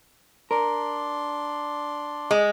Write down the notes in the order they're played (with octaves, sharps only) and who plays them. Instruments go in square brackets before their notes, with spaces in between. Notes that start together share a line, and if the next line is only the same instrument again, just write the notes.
[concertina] D4 D5 C6 [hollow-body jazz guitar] A#4
[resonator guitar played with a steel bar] G#3